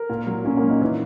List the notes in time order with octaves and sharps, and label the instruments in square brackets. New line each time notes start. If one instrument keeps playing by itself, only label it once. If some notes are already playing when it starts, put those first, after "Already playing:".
Already playing: [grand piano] A#4
[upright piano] A#2
F#3
[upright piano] A#2 [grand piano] C#4
[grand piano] A#3
[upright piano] F#3
[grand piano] D#4
[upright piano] E3 [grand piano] D#4